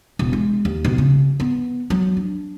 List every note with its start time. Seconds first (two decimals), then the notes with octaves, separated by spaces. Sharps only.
0.19 E1
0.33 G#3
0.65 D#2
0.85 B1
0.98 C#3
1.40 B3
1.90 F#3
2.17 D4